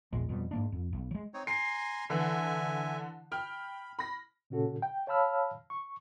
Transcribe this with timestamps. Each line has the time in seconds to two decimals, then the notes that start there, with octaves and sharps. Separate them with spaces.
0.13 A#1 E2 A#2 G#3
0.29 F2 B2 G3
0.51 G#2 A#3 D4
0.72 F2
0.93 B1
1.11 F#3 G#3
1.34 C4 D#4 C#5
1.47 G#5 A#5 C6 C7
2.10 D3 E3 E5 G#5
3.32 G5 B5 F6
3.99 B5 A#6
4.50 A#2 C#3 C#4 F#4 A4
4.82 G5
5.07 C#5 F5 A5 B5 E6 F6
5.70 C#6